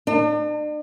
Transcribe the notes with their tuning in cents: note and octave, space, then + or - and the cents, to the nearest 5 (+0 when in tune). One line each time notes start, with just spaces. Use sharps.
D4 +45